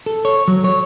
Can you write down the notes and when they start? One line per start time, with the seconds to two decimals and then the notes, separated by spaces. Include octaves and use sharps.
0.06 A4
0.25 C#5
0.48 F#3
0.64 C#5